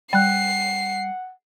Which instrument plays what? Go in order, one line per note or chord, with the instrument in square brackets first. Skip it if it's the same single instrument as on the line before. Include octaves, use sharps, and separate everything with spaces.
[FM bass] G3 [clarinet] F#5 [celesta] G5 F#6 [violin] C7